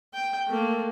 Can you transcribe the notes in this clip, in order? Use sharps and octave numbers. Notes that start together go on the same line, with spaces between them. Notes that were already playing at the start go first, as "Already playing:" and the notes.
G5
A3 A#3